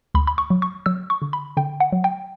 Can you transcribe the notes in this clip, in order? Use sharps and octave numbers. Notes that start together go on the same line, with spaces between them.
D2 B5
B5
C#6
F#3
C#6
F#3 E6
C#6
D3
B5
D3 G5
F#5
F#3
G5